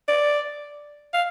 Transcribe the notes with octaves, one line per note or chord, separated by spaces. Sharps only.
D5
F5